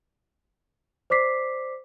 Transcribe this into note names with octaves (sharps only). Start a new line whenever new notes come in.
C5 D5 D6 B6 C7